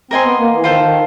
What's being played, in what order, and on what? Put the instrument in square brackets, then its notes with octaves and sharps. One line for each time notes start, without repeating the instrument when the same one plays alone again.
[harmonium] C4 [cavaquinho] A#4 D#5 G#5 C6
[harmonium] B3
A#3
E3
[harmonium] D#3 [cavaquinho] F4 A4 C5
[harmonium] D#3